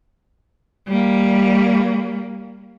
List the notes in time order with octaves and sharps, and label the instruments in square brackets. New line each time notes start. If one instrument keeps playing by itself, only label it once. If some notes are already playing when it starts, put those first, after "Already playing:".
[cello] G3 A#3